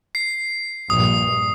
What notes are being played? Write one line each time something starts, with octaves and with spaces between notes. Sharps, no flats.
C7
A#1 G2 D#6